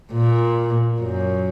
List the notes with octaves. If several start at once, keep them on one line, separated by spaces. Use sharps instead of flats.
A#2
F#2